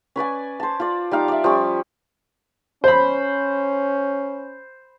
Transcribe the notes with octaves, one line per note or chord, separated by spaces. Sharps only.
C#4 B4 D5 G#5
C5 A5
F4 D5
G3 D#4 F5 D6
D5 E5
F3 G3 C#4
C#4 C5 B5